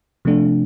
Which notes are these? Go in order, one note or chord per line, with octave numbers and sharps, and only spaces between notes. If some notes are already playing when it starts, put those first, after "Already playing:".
C3 F3 A3 D4